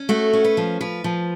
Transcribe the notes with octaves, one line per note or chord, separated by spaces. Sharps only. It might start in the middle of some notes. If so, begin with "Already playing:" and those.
Already playing: C#4
A3 F#4
C#4
B4
F3
F3 B4
F3